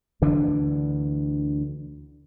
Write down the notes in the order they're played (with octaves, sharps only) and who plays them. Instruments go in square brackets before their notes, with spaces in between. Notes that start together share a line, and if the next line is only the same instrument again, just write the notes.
[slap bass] D2 D3 E3 D4